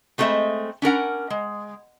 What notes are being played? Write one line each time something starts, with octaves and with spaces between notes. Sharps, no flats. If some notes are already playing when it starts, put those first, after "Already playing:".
G#3 A3 C4 A4 D#5 E5
C#4 D4 A#4 F#5
G#3